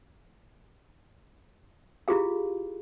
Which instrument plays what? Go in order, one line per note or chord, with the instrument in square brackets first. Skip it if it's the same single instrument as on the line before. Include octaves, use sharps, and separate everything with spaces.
[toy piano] E4 F4 G4 G#4 F5